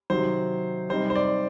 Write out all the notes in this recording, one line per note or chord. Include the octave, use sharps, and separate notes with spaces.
C3 D#3 F#3 C5
C3 G3 C4 D#4 C5
C5
D5